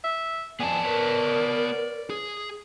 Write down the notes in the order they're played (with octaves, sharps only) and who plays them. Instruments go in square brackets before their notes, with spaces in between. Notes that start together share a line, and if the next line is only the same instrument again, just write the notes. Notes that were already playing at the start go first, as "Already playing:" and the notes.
[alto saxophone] E5
[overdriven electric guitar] F2 G#4 [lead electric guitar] B3 A5 [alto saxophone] D5
[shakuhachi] A#4 [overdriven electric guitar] B4 C#5
[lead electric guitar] G#4